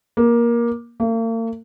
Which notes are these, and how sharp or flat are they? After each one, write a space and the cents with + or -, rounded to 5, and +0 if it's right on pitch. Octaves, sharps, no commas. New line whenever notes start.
A#3 +15
A#3 -45